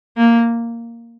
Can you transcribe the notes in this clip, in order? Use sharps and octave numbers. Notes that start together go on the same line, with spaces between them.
A#3